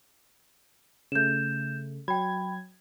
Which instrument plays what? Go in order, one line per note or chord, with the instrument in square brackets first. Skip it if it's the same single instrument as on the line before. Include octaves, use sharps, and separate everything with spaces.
[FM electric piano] C#3 A3 [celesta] G6 E7
[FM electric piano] F#3 G#6 [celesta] G5 B5